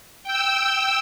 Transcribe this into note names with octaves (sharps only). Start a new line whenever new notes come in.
G5 E6